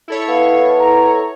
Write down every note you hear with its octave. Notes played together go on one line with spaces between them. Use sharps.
E4 A4 C#5
B3 F5
A#5